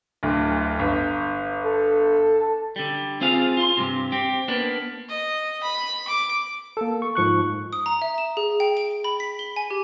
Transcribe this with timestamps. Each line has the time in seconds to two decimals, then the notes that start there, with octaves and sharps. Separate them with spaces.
0.23 D1 D2
0.79 G1
1.64 A4
2.76 D3 G3
3.21 C4 F4 G#4 F5
3.57 F4 C6
3.77 G2 C3
4.12 C4 G4
4.48 A#3 B3 D4
5.09 D#5
5.64 B5
6.08 D6
6.77 A#3 A4
7.02 C#6
7.15 G#2 F3 C#6 F#6
7.72 D#6
7.86 A#5
8.02 E5
8.18 E7
8.37 G#4
8.60 G5
8.77 D7
9.04 B5
9.20 B6
9.39 G7
9.56 G#5
9.70 G4